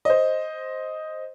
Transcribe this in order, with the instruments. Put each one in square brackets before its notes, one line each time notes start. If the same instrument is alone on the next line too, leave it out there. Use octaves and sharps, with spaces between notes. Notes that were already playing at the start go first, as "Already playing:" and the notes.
[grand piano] C5 D#5